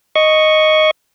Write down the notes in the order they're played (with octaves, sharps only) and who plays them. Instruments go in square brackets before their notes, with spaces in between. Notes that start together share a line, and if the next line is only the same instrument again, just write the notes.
[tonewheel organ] D#5 C#6